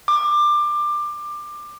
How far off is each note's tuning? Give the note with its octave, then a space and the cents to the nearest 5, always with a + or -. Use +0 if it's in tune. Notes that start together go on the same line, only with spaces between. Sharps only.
D6 +20